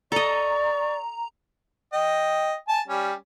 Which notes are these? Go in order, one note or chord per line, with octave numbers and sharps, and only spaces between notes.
A4 D5 D#5 A#5 C#6
D#5 G5
G#5 A5
G3 C#4